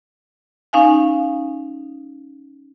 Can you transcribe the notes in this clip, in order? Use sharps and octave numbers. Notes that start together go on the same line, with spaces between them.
C#4 D#4 F5 G#5